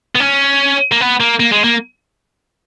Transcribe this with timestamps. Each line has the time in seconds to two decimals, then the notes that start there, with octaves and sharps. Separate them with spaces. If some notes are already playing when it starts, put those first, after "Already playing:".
0.15 B3
0.20 C#4
0.92 A#3
1.01 B3
1.20 A#3
1.40 A#3
1.52 G#3
1.64 A#3